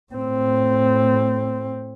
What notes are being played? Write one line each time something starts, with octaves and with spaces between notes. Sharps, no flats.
A2 C4